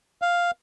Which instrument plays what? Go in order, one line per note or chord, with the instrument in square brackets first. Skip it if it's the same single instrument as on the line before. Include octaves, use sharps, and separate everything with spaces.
[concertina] F5